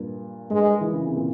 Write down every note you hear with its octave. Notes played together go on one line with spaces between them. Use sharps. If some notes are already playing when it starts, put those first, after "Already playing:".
Already playing: G2 A#2
G2 G#3
E3
C#3
C3
A#2